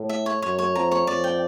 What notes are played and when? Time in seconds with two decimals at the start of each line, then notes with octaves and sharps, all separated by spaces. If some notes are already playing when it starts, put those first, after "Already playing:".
Already playing: A2
0.09 E5
0.26 C#5
0.42 F#2 C#5
0.59 C#5
0.75 F2 A#5
0.92 C#5
1.07 F2 D5
1.24 G5